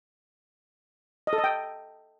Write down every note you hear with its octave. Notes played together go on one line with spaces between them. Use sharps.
D#5
A4
D#5
G5